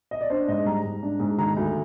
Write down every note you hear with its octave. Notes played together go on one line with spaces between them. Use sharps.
D#5
D5
D4 C5
G#2 D#5
G3 A#5
G#2
D4
G#2
D#3 A#5
D2